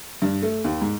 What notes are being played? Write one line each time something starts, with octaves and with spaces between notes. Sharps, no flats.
G2
A3
D#2
G#2